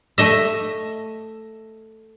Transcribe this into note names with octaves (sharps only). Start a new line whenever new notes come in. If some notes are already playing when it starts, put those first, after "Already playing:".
A3 D#5 E5